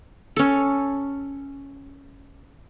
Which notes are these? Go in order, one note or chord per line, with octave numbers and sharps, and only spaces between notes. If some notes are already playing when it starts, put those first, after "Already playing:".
C#4 A4